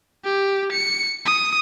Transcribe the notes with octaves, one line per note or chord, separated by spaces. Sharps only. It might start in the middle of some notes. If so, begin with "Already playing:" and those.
G4
C#7
D#6